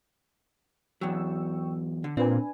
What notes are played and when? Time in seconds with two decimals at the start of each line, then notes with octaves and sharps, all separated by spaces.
1.01 E2 F#3 G5 C#6 E6
2.04 D3
2.17 A#2 C4 D4 B4 G#5